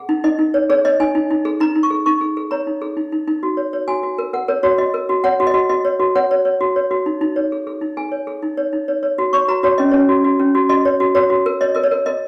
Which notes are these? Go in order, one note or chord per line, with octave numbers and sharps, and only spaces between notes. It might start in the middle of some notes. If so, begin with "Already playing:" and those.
Already playing: G#4 F#5
D#4
D#4 D#5
D#4
C#5
G#4 C#5
C#5 D#5
D#4 G#5
D#4
D#4
G#4
D#4 A#5
D#4
C#6
G#4
D#4 C#6
G#4
G#4
C#5 A#5
D#4
G#4
D#4
D#4
D#4
F#4
C#5
C#5
F#4 G#5
F#4
A#4
A#4 F#5
A#4 C#5
F#4 C#5
F#4 D#5
A#4
F#4
C#5 F#5
F#4
D#5
F#4
F#4 D#5
C#5
F#4
C#5 F#5
C#5
C#5
F#4
C#5
F#4
D#4
D#4
C#5
G#4
G#4
D#4
G#4 G#5
C#5
G#4
D#4
C#5
D#4
C#5
C#5
F#4
C#5 C#6
F#4 A#5
F#4 C#5
C#4 D#5
C#4 C#5
F#4
F#4
C#4
F#4
F#4 D#5
C#5
F#4
F#4 C#5
F#4
A#4
C#5 D#5
A#4 D#5
C#5
A#4
A#4 D#5